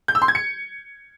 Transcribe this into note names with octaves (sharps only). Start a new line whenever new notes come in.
G6
E6
C6
G#6
C#7